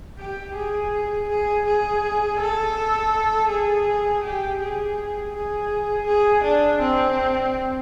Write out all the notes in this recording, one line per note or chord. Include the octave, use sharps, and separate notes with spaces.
G4
G#4
G#4
G#4
A4
G#4
G4
G#4
G#4
G#4
D4
C4